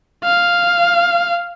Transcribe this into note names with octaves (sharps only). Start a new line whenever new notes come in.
F5